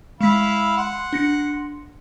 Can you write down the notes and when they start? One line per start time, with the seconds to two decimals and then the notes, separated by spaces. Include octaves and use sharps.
0.21 G#3 E4 F5 B6
0.77 F#5 C6
1.13 D4 A#6 C#7